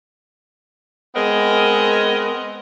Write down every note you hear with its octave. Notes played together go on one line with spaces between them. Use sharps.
G#3 B3 C4 A#4 D#5